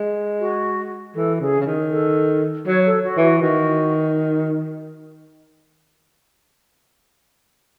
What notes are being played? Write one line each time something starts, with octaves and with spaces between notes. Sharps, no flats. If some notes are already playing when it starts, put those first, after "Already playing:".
Already playing: G#3
F#4
E3 A4
C#3 G#4
C#3
D#3
A4
F#3 C#5
A4
F#4
E3
F#4
D#3 F#4